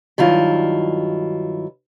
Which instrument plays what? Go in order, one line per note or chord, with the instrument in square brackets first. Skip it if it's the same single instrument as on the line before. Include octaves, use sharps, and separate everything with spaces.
[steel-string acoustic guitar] G2 D#3 F#3 E4 F4